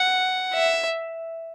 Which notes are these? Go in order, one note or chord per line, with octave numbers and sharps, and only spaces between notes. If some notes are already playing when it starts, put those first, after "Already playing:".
Already playing: F#5
E5